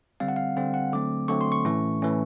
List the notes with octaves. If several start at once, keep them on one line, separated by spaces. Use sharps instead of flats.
D3 G3 C4 F5
F#5
F5
D3 G3 C4
F#5
D3 F#3 A3 C4 D6
D3 F#3 A3 C4 C#6
C6
C#6
A2 E3 A3 C#4
A2 E3 A3 C#4